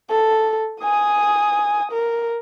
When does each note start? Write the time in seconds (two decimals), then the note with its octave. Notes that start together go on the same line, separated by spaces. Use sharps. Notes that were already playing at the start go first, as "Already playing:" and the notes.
0.10 A4
0.82 G#5 D#6
1.92 A#4